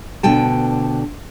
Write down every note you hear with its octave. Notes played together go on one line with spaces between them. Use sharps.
D2 B2 D3 G5 A5